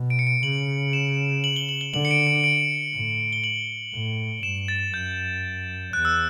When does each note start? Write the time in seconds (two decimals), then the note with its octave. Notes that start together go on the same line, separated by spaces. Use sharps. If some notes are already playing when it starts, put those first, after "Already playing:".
Already playing: B2
0.10 D7
0.19 C#7
0.27 D7
0.43 C#3 F#7
0.93 E7
1.44 F#7
1.56 G7
1.69 F#7
1.81 G7
1.93 D3 F#7
2.05 C#7
2.11 D7
2.27 D7
2.44 D7
2.94 A2
3.33 G7
3.44 F#7
3.94 A2
4.43 G2 E7
4.68 A6
4.93 F#2 G6
5.93 E2 F#6
6.05 E6